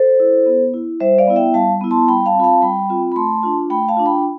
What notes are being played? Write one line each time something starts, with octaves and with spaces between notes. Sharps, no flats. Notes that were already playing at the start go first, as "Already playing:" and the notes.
Already playing: A4 C5
E4
B3
E4
G3 C5 E5
D5 F5
B3 E4
E5 G5
G3 F5 A5
B3 E4
A5 C6
G3 G5 B5
F5 A5
C4 F4 B5
F5 A5
G3 G5 B5
C4 F4
B5
A3 A5 C6
D4 F4
A3 G5 B5
F5 A5
D4 F4
G5 B5